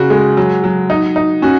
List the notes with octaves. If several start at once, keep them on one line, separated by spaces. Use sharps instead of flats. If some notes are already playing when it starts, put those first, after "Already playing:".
Already playing: C#3 F#4
G#3
F#3
F#3
D#4
D#4
C#4 F#4